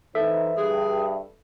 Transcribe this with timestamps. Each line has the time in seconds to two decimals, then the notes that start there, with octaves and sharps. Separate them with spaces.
0.15 E3 D#4 A4 C5 E5
0.57 G2 G#4